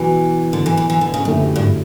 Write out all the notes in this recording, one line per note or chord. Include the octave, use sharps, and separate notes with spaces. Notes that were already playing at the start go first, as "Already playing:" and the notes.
Already playing: B2 E3 F#3 B3
D3
E3
E3
E3
D3
C#3
F#2 A2 D3 A3 E4 G4
G2